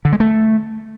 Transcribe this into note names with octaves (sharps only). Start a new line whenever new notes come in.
D3
G#3
A3